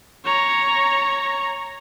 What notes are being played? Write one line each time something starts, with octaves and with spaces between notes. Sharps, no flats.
C#5 A#5